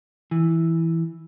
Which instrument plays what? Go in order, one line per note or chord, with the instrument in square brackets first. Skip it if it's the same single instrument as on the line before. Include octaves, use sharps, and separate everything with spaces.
[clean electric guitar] E3